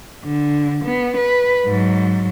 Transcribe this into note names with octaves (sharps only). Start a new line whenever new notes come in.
D3
B3
B4
G#2 F#3